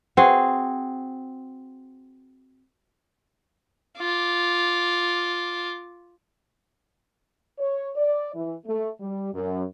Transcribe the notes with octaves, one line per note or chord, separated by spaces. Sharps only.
C4 F#4 G#4
F4 D6
C#5
D5
E3
A3
G3
F#2